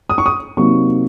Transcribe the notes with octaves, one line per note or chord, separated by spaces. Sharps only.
D#6
C#6
D#6
C3 F#3 A#3 D#4 C#6